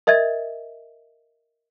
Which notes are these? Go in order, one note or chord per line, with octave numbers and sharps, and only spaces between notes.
A#4 D#5 E5 G#6 A6